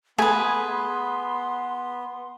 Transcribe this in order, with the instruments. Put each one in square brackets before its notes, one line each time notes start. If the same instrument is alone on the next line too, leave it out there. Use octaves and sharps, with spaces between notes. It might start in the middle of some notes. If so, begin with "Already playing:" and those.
[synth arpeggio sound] A3 G#5 [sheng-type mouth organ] B3 [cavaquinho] G#4 B4 [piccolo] C6